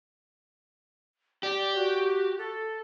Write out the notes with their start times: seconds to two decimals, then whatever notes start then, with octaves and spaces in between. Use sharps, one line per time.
1.43 G4 D5
1.75 F#4
2.38 A4